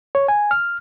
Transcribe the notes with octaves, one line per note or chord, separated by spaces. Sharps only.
C#5
G#5
F6